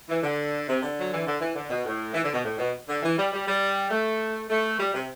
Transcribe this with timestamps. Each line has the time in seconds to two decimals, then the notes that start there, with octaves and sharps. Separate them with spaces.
0.09 E3
0.23 D3
0.68 C3
0.83 D3
0.99 F#3
1.13 E3
1.26 D3
1.40 E3
1.55 D3
1.70 B2
1.85 A2
2.14 E3
2.24 D3
2.34 B2
2.44 A2
2.58 B2
2.88 D3
3.03 E3
3.18 G3
3.33 G3
3.47 G3
3.90 A3
4.50 A3
4.79 G3
4.93 C3